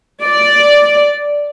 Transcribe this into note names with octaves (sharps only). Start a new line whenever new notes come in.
D5